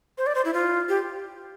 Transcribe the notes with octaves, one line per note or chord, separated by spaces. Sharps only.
C5
D5
C5
E4
F4
G4